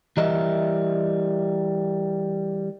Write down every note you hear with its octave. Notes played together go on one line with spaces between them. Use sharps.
E3 G3 A#4 D#5 E5